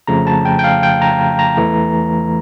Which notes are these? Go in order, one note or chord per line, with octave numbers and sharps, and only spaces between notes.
F2 C#3 F3 A3 A#5
A5
G5
G5
F5
G5
A#5
A#5
E2 E3 A3